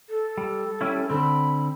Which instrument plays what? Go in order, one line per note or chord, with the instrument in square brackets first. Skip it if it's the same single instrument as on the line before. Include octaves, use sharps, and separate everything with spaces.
[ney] A4
[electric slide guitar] G3
G3 C#4 E4
[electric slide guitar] D3 C4 [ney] B5